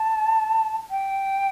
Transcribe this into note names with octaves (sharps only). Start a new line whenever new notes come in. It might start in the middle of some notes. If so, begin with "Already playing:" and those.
Already playing: A5
G5